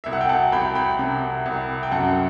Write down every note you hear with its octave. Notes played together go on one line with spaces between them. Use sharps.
C2 E5
F#5
G5
F#5 A5
C2 G5 B5
G5 B5
C3
C2
G5
F#2 F#5 A5